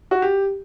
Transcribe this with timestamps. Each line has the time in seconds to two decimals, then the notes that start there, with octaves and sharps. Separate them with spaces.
0.11 F#4
0.22 G4